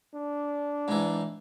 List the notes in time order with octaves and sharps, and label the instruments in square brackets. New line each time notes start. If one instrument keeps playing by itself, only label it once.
[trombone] D4
[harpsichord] G#2 E3